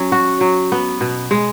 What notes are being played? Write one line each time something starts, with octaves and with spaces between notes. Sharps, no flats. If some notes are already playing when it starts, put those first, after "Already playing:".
Already playing: F#3 C#4
F#4
F#3
B3
B2
G#3